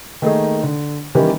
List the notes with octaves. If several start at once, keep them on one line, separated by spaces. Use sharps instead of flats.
D#3 A3 A#3 D#4 G#4
D3
D#3 E3 G3 A#3 C#4 G4